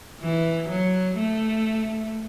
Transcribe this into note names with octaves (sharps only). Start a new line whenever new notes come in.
E3
F#3
A3